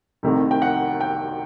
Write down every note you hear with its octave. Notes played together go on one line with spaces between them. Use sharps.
C2 C3 D#3 A3
G5
F#5
G5